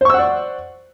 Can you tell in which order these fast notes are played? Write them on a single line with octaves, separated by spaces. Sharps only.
C5 C#6 E6 F#5 D5